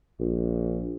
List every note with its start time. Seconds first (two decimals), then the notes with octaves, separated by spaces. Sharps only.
0.20 A#1